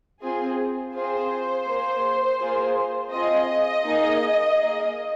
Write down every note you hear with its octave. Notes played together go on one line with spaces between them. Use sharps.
C4 F4 G#4
C4 F4 G#4 C5
A#3 G#4
A#3 F4 G#4
C4 F4 G#4 D#5
A#3 D#4 G#4
A#3 G#4